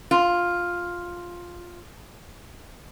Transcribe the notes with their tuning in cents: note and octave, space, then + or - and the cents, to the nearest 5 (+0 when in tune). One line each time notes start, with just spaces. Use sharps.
F4 +5